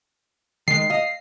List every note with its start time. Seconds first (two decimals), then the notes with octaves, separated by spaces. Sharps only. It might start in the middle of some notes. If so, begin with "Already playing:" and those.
0.68 D#3 G#3 C7
0.90 D#5 F5